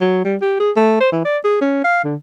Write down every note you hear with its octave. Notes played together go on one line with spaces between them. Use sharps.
F#3
G3
G4
G#4
A3
C5
E3
D5
G#4
C#4
F5
D3